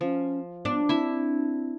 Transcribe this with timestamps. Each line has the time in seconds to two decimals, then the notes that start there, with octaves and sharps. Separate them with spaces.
0.01 F3 C#4
0.65 B3 D4
0.89 C4 E4 E5